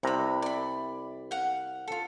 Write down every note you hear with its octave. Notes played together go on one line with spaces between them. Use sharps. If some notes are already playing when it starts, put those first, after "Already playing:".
C2 C3 B4 A#5 B5
D5 B5
F5 F#5
F4 A4